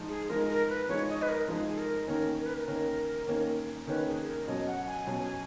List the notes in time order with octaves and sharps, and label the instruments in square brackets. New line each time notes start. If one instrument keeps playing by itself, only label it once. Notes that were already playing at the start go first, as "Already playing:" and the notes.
Already playing: [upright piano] F3 G#3 D#4
[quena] G#4
[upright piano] F3 G#3 D#4 [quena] A#4
[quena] A#4
B4
[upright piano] F3 G#3 D#4 [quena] C#5
[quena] D#5
B4
A#4
[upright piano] F3 G#3 D#4 [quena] G#4
[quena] G#4
A#4
[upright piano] D#3 A#3 C#4 [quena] A#4
[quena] A#4
B4
A#4
[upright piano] D#3 A#3 C#4 [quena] A#4
[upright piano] D#3 A#3 C#4
[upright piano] D#3 A#3 C#4 [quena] B4
[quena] G#4
A#4
[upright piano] B2 F#3 C#4 [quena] D#5
[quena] F#5
G#5
[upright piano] B2 F#3 C#4